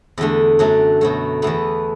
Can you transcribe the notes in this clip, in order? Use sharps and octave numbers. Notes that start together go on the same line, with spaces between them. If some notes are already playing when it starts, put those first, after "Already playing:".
E2 D3 A3
F#2 F#3 A3 D4
B2 F#3 A3
E2 E3 A3 B3